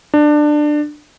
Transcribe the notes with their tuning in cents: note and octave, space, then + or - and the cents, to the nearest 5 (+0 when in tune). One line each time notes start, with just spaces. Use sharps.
D4 +20